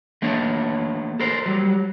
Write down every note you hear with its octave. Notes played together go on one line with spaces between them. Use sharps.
A3 A#3 D4 C#5
A4 A#4 C5
F#3 G3